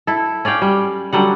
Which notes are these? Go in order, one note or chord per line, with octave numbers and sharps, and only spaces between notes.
E4 A4
C#4 D5 F5 G5
G3
D3 F#3 G3 F#5